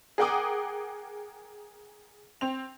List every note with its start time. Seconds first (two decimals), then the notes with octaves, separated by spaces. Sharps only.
0.18 G#4 A#4 F#5 G5 D6 D#6
2.41 C4 F7